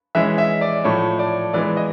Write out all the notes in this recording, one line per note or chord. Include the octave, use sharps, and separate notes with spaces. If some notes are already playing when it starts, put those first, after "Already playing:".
E3 G#3 C#4 E5
E5
D5
A2 F3 A3 C#5
D5
E3 G#3 B3 D5
D#5